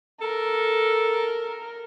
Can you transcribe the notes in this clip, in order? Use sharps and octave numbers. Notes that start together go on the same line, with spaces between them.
A4 A#4